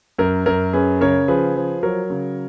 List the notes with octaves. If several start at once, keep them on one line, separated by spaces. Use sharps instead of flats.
F#2 A#4
F#2 A#4
C#4 G#4 B4
C#3 A#4 C#5
F3 G#4 B4
F3
F#3 A#4 C#5
C#3